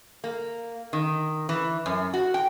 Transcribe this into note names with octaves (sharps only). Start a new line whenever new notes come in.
A#3
D#3
E3
F#2
F#4
G5